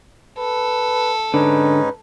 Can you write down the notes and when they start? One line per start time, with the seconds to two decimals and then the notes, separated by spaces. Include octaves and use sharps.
0.38 A4 B4
1.34 G#2 D3 C#4 D#4 B4